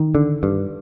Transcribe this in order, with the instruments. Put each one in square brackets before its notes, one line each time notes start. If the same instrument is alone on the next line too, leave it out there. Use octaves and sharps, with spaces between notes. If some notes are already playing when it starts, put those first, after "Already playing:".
Already playing: [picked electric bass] D#3
D3
G2